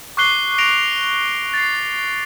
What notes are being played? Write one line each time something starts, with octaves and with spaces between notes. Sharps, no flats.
C#6 D6 F#6 C7 G7
A#6 D7 F7
A6 C7